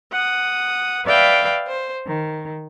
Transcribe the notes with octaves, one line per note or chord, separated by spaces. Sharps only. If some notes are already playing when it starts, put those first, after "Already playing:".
F#5 D#6
B4 D5 E5 F5 G5 B5
C5
D#3